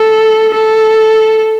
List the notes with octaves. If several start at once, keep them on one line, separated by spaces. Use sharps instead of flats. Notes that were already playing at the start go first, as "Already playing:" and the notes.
Already playing: A4
A4